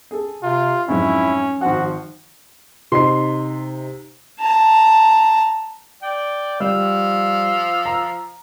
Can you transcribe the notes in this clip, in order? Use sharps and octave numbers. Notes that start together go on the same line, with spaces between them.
G#4 A4
C3 F4
F2 G#2 F#3 C#4 E4
G#1 F3 F#4 F#5
C3 D#4 C6 C7
A5 A#5
D5 G5
F3 G3 F5 E6
A#5